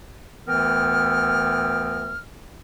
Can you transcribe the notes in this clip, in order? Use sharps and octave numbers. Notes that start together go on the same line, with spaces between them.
D2 E3 B3 A#4 G5 F6